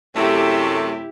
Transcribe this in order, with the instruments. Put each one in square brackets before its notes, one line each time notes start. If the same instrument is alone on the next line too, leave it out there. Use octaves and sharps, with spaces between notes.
[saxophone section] F#2 C3 A3 [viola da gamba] E4 G4